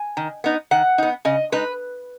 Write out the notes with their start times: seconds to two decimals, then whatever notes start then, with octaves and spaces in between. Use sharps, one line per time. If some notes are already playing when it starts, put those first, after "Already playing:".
Already playing: G#5
0.17 D#3
0.44 B3 D#4
0.71 D#3 F#5
0.98 B3 D#4
1.25 C#3 D#5
1.52 G#3 D#4 B4